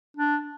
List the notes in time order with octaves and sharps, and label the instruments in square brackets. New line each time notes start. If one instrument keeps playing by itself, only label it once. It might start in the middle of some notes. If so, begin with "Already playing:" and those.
[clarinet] D4